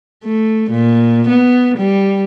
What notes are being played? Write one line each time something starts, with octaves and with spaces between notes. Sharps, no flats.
A3
A#2
B3
G3